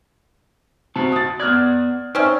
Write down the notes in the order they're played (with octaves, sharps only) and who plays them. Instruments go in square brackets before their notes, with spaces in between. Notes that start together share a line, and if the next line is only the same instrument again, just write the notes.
[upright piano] C3 [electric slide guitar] F#4 A5
[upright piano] D#6 A6
[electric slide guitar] B3 D5 [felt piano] F6 F#6 G#6
[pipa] C4 C#4 [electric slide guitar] D#4 [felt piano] C#5 D5 E5